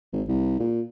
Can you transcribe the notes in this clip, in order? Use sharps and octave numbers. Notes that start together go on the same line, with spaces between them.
G#1
C2
A#2